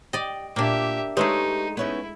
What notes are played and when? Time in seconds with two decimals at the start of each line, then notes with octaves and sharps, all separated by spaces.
0.13 G4 D5 D#5
0.56 A#2 A#3 D4 G4 E5
1.17 G#3 A3 D#4 G4 G#4 B4 C#5
1.77 B3 C#4 D#4 E4